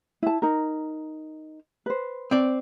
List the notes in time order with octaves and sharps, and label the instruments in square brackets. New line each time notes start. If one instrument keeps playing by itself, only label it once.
[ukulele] E4 A5
D#4 A#4
B4 C5
[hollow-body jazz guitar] C4 D5